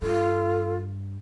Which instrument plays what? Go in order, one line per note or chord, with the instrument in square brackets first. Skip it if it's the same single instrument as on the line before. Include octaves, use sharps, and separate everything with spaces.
[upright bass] G2 [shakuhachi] F4 [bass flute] A4